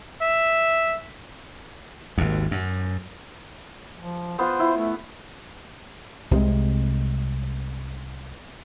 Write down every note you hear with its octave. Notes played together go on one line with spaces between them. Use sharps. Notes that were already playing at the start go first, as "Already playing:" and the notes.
E5
G#1 D#2
F#2
F3
B3 F4 C5
E4
A3
C2 C3 F3 G#3